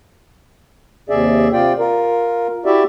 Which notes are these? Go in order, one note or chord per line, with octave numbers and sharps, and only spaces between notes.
D#2 C3 G#4 D5 E5
C3 F4 D5 G5
F4 A#4
E4 F#4 G4 D5 E5